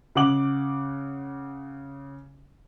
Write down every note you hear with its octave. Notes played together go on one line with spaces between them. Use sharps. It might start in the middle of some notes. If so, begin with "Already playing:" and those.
C#3 F#5 D6 F#7